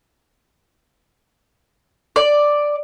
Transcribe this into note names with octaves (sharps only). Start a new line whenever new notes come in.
D5